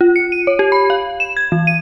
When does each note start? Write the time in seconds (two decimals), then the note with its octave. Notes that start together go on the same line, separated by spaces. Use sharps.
0.01 F4
0.16 C#7
0.32 D#7
0.47 C#5
0.59 G4
0.72 B5
0.90 F5
1.20 E7
1.37 G#6
1.52 E3
1.67 D#7